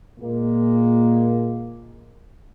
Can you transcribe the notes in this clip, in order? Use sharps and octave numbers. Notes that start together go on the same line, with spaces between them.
A#2 G#3 A#3